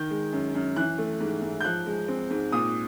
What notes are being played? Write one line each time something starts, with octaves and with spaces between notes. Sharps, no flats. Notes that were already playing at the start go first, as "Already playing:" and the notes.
Already playing: D#3 G6
G#3
F#2
F#2
E3 F#6
A3
G#2
G#2
G6
F3 F#6
G#3
C4
G#2
A#2 D#6